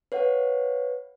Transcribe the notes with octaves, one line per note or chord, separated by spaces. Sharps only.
B4 C#5 F5 F#5